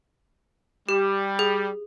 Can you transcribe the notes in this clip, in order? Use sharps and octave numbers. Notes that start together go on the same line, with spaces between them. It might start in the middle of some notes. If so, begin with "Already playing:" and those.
G3 G4
G#4